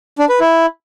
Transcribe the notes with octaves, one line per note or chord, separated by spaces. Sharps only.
D4
B4
E4